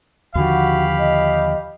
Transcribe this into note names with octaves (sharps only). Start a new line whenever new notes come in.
D#2 D3 F3 F#4 G4 F5 B5
D#5